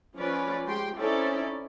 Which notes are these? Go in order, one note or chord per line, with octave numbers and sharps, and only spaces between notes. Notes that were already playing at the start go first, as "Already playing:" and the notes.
F3 C#4 F4 B4 D5
G#3 G4 G5 C6
C4 C#4 D#4 E4 A4 D5